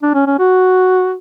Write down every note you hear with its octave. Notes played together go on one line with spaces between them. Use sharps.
D4
C#4
C#4
F#4